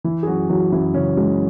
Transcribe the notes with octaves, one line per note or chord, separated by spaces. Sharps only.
E3 E4
G#4
F#2 F#3 F#4
E3 F#3 F#4
F#2 E3 E4
C#3 E3 C#4
F#2 G#3